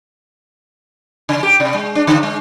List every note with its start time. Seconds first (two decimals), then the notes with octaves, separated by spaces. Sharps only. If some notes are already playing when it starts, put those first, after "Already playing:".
1.29 C#3
1.43 G4
1.60 C3
1.74 G#3
1.95 D4
2.07 D3
2.23 G#3